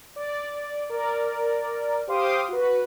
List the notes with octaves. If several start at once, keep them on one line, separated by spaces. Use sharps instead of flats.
D5
A#4 D5
G4 C5 F5 C6 D6 D#6
F#4 B4